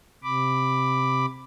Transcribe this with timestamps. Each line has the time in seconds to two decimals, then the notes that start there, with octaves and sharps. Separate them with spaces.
0.23 C3 B5 D6